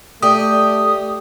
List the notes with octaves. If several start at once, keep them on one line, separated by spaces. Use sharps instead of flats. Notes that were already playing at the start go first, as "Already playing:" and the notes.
A3 G4 D5 D#6